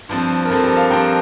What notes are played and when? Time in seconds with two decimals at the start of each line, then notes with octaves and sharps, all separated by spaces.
0.09 G2 F3 C4
0.45 A#4
0.49 G2 F3 C4 A4
0.63 G4 A#4
0.77 F5 A5
0.90 G2 F3 C4 G5 A#5